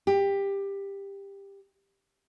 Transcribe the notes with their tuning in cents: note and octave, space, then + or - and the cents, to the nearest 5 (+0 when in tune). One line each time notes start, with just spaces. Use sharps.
G4 +15